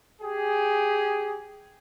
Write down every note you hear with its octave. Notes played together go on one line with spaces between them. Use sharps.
G4 G#4